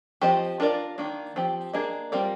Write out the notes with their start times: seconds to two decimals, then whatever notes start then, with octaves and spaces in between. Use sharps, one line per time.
0.21 F3 C4 G4 C5 D#5
0.60 D4 F4 A#4 D5
0.98 D#3 A#3 D4
1.36 F3 C4 G4
1.73 A#3 D4 G#4 D#5
2.12 G3 C4 F4 A#4 D5